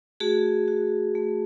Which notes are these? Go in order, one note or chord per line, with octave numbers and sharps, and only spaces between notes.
A3 F#4 G#4
F#4
A3